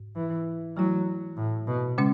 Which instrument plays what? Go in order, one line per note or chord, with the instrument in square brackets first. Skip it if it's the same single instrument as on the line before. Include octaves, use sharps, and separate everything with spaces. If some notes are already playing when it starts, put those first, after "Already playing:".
Already playing: [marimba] G#2
[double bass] E3
[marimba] E3 A3 E4 [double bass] F#3
[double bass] A2
B2
[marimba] C#3 G#3 C#4